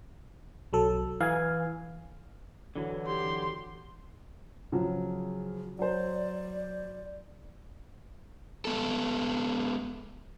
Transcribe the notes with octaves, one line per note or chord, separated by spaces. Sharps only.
B1 F#3 A4
E3 F5 G#5
D3 E3 F#3
G4 C6
C#3 F3 F#3
F#3 C5 D5
G#3 B3 A4